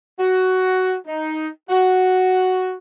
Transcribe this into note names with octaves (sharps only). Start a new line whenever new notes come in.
F#4
D#4
F#4